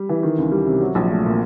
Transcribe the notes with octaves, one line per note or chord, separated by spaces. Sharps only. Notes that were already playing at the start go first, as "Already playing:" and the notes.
Already playing: G3
E3
D#3
C#2
G3
C3
F#3
A#1
A3
A#2